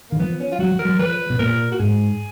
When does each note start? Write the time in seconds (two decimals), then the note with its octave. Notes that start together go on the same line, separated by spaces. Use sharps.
0.10 D#3 A#3
0.19 F3 B3
0.40 C#4
0.52 F4
0.59 F#3 F#4
0.72 F3
0.79 A#4
0.85 F#3
0.99 F3 B4
1.30 B2
1.39 A#2 A#4
1.72 F#4
1.79 G#2 G#4